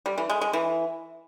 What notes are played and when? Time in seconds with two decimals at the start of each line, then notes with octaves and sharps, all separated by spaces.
0.06 G3
0.18 E3
0.30 G#3
0.41 G#3
0.53 E3